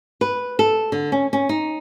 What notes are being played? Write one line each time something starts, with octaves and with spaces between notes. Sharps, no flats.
B4
A4
D3
C#4
C#4
D#4